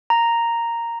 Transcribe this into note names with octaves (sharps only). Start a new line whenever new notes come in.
A#5